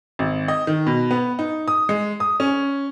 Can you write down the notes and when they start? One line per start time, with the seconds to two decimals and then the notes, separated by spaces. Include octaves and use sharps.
0.19 G#1
0.48 D#5
0.67 D#3
0.86 B2
1.11 B3
1.39 D#4
1.68 D#6
1.89 G#3
2.20 D#6
2.40 C#4